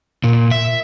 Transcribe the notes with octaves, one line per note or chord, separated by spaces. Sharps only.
A#2
E5